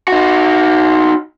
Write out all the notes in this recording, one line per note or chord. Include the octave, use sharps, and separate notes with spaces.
D#4 F#4